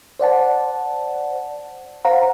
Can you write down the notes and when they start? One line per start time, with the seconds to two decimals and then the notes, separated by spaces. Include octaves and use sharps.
0.19 C5 D5 F#5 A5
2.05 C5 F5 F#5 A#5